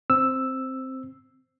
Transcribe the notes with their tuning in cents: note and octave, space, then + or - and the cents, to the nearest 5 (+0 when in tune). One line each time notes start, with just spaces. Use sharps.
C4 +0 E6 +0